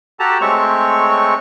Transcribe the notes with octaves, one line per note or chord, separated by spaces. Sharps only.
F#4 G4 A4 A5 A#5
G#3 A3 C4 C#5 C#6